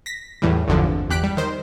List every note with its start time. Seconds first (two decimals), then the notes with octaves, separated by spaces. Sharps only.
0.06 A#6 B6
0.42 E2 A2 E3 G3
0.68 G#1 E2 G2 D3 E3 F3
1.10 E2 G4 F#6 B6 D7
1.23 G3
1.37 D#3 C5